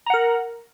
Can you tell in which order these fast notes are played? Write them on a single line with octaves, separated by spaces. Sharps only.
A#5 F#5 A#4